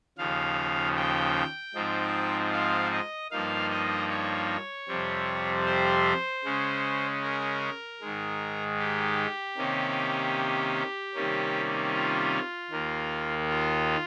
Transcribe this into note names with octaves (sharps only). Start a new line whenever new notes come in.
D#2 C#3 F3 F5
G5
G#2 F3 C4 D#4
F5
D#5
G2 F3 A#3 D#4 F5
D#5
C#5
F2 C3 G3 C4
C5
C#3 G#3 C#4
A#4
G#2 D#3 G#3
G4
C3 D#3 A#3 C#4
C3 D#3 G3 A#3 C#4
F4
D#2 D#3 A#3
F4